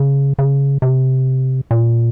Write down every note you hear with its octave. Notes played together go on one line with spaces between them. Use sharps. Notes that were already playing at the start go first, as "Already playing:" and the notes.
Already playing: C#3
C#3
C3
A#2